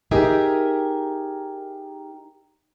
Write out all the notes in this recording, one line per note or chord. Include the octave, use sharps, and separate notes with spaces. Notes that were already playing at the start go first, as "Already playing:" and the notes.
D#4 G4 G#4 A#4 E5